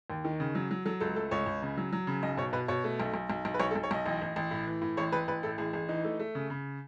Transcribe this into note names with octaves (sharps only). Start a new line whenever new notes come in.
D#2
D#3
C#3
F#3
F#3
F#3 A4
C#2 A4
A3 A4
C#2 C#5
C#2
C#3
F#3
F#3
C#3
B1 D#5
B2 C#5
B2 B4
B2 C#5
A3
B1
B1
B1
B1
B4
B1 C#5
A4
B1
C#5
B1 D#5
A1 D#5
A1
A1
A2
E3
A2
A1 C#5
A1 B4
A1 B4
A2 A4
A1 G#4
A1 G#4
E3 D#4
A3
A3
C#3
C#3